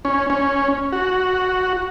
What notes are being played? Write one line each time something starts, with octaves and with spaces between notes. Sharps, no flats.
C#4
C#4
F#4